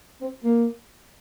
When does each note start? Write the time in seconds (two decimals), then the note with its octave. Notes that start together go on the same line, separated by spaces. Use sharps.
0.21 C4
0.44 A#3